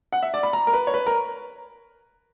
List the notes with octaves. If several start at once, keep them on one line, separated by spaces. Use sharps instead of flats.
F#5
E5
D5
B5
A#5
A#4
B4
C#5
B4
A#4